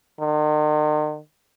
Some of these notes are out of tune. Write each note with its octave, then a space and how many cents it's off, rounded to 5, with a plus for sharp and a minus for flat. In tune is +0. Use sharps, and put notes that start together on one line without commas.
D#3 -45